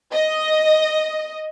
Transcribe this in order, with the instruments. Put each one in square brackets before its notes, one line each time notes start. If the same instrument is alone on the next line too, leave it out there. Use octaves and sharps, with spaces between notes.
[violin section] D#5